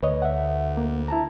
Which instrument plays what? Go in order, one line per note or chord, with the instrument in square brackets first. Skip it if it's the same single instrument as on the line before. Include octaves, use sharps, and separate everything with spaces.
[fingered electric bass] D2 [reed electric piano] B4 C#5 D#5
[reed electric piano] E5 F#5
A#3
E4 A5 A#5